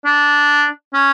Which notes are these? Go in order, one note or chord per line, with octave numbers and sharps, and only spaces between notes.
D4
C#4